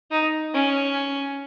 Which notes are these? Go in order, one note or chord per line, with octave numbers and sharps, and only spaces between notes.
D#4
C#4